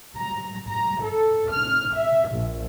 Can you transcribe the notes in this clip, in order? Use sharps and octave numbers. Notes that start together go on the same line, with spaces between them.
A#5
A#5
A4
F6
E5
A#1